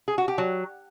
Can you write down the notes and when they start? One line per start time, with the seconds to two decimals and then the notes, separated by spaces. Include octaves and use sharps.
0.08 G#4
0.18 F#4
0.28 G4
0.38 F#3